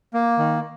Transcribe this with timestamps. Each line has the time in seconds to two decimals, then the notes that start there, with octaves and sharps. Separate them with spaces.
0.14 A#3
0.38 D#3